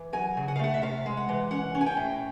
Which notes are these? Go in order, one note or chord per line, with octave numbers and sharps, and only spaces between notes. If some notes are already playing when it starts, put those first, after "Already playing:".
Already playing: E3
F#3 G#5
C#3
F#5
F5
A3 F#5
E5
C3 F5
G#3
F#5
E3
C#4 F#5
C#4
G#5
G5
A2